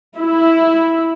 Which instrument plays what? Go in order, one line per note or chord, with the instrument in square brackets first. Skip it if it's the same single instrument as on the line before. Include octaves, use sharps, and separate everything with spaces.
[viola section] E4